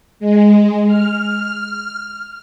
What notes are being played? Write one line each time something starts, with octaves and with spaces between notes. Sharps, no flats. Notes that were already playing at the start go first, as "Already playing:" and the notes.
G#3
F6